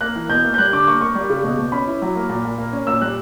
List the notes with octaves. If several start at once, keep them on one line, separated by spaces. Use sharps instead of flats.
A#3 F#6
E3
B2 G6
A#3
G6
G3 F#6
D3 D6
A#3 C#6
A#3 C#6
G3
C#3
B2
B2
C#4 B5
E4
F#3
A#3
A#2
A#2
A#3
C#4
A#2 E6
G3 F#6